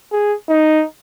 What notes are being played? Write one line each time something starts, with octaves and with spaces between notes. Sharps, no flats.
G#4
D#4